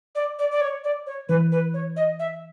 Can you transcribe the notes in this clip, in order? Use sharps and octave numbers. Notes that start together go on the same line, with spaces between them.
D5
D5
D5
C#5
D5
C#5
E3 B4
B4
C#5
D#5
E5